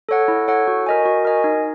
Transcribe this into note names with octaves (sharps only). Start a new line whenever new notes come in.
A4 C#5 F#5
E4
A4 C#5 F#5
F#4
A#4 D#5 G#5
F#4
A#4 D#5 G#5
D#4